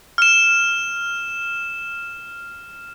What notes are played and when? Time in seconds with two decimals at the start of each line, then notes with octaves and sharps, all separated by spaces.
0.18 F6 E7